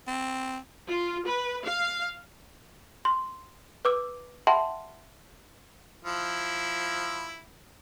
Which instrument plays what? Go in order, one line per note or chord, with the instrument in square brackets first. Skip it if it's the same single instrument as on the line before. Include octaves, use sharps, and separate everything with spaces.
[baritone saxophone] C4
[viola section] F4
B4
F5
[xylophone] C6
B4 D6 E6
E5 F#5 G5 A5 B5 C6
[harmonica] F3 E4